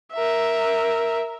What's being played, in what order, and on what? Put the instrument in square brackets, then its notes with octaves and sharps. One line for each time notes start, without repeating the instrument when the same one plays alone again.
[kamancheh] A#4 E5